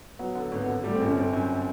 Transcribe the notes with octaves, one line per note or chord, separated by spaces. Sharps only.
F#3 B3
D3
G#1 B3
B3
D3
G3 A3
C4
G1
C#4
G1 C4
F#2